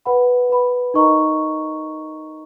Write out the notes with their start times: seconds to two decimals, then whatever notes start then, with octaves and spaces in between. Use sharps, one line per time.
0.05 B4 F#5 B5
0.50 B4 F#5 B5
0.94 D#4 A#4 D#5 A#5 C#6